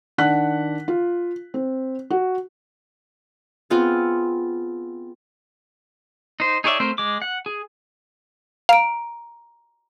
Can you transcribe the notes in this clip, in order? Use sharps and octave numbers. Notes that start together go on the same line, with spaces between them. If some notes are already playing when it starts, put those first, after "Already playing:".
D#3 D4 F#5 F#6 B6
F4
C4
F#4
B3 C4 F4 G#4
D#4 C5
D#4 G#4 C#5 D5 E5
A3 C4 A#4 C5
G#3 D6
F#5
G#4
F5 A#5 D7